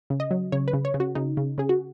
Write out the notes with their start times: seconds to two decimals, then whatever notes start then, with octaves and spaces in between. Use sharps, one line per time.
0.10 C#3
0.20 D#5
0.31 F#3
0.52 C#3 C#5
0.68 B4
0.73 C#3
0.85 C#5
0.94 C#3
1.00 F#4
1.15 C#3 D#4
1.37 C#3
1.58 C#3 G#4
1.69 F#4